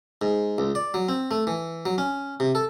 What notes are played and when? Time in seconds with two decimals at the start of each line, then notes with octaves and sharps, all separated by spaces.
0.22 G#2
0.58 C#2
0.75 D5
0.94 F#3
1.09 C4
1.31 A3
1.47 E3
1.86 F#3
1.98 C#4
2.40 C3
2.55 A4